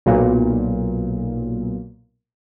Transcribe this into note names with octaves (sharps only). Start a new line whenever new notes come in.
B1 A#2